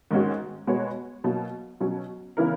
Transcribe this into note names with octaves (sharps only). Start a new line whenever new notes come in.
G#2 D#3 G#3 C#4 F#4
B2 G#3 B3 F#4 C#5
B2 F#3 A#3
B2 F#3 C#4
C#3 E3 B3 E4 A#4